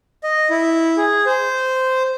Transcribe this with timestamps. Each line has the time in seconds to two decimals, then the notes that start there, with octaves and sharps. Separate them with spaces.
0.24 D#5
0.50 E4
0.97 G#4
1.26 C5